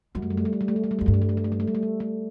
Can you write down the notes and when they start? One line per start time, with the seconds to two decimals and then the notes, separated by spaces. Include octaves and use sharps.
0.15 F#2 G3
0.22 A3
0.30 G3
0.37 A3
0.45 G3
0.53 A3
0.61 G3
0.68 A3
0.76 G3
0.84 A3
0.91 G3
0.99 F#2 A3
1.06 G2 G3
1.14 A3
1.22 G3
1.29 A3
1.37 G3
1.44 A3
1.52 G3
1.60 A3
1.68 G3
1.75 A3
1.83 G3
2.00 A3